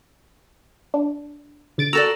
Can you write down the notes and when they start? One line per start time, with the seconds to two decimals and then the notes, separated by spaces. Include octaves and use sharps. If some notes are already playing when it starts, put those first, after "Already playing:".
0.94 D4
1.78 D3 A6 D7
1.93 F#4 A4 D5 A#5 E6